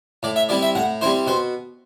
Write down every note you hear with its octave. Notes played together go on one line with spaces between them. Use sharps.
A2 D5
E5
G3 C4 E4 D5
E5
A2 F#5
G3 C4 E4 C5
B2 C5